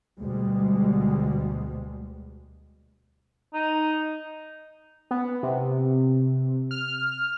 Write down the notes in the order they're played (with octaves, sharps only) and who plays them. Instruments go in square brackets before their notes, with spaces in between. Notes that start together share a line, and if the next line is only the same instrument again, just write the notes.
[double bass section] D2 B2 G3 G#3
[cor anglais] D#4
[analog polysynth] B3
C3
F6